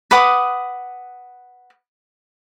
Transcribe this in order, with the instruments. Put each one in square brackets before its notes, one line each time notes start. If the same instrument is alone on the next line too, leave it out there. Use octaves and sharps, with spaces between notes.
[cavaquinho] B4 F#5 D6 D#6